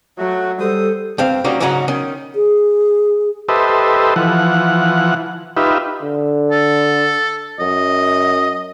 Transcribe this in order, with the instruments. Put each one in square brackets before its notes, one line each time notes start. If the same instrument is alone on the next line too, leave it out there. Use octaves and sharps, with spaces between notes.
[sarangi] F#3 [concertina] A3 F#4
[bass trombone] G3 [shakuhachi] A4 [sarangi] C5 [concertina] D#6
[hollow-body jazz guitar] G2 C4 F5
D#3 G3 A#3 C#4 F#4 A#4
G#2 C#3 F#3 C#4 D#4 F#4
D#3 C#4
[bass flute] G#4
[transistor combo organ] G4 A4 B4 C5 D#5 E5
E3 F3 F#5
D#4 F4 G4 B4 E5
[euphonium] D3
[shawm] A4
[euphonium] F#2 [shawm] D#5